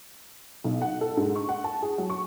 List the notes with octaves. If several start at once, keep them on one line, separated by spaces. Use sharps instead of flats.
B1
F#5
A4
G#2
C#6
F#5
A5
G#4
F#3
C#6